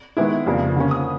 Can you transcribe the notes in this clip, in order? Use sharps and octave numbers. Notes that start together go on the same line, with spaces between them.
D#3 G#3 B3 E4
F2 C#3 F3 A#3 D4
D3 F3 A#3 C#4
D#6